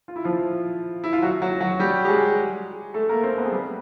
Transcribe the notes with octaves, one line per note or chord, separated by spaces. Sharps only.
F4
E4
F3 F4
E4
F4
F#3 F#4
F#3 F#4
F#3 F#4
G3 G4
G4
G#3 G#4
A3 A4
A#3 A#4
C4 C5
B3 B4
G#4
G3 G4